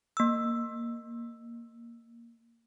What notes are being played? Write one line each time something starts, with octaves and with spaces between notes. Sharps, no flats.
A#3 E6